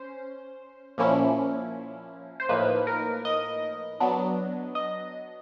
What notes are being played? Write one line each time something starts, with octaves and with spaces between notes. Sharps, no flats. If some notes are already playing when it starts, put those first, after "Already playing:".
Already playing: C#4 C5
A#2 F3 A#3 C#4 E4
C5
A2 F3 A#3 D#4 B4
A#4
D#5
F#3 B3 D4
D#5